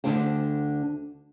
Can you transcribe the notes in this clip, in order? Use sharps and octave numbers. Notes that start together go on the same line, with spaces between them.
D2 D3 E3 D4 C5 G5